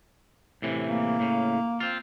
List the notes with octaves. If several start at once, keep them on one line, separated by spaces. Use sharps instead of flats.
A2 C3 E3
A#3
A2 C#3
C4 F4